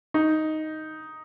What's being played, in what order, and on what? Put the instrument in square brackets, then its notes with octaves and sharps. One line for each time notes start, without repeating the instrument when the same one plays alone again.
[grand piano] D#4